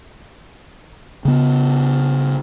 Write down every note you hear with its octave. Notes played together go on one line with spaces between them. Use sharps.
C#3 B3